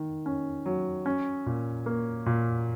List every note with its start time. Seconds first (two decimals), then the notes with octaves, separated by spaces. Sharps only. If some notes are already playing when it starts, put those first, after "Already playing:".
Already playing: D#3
0.26 C#4
0.66 F#3
1.06 C#4
1.46 A#2
1.86 A#3
2.26 A#2